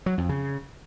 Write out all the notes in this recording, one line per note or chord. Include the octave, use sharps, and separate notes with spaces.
F#3
F2
C#3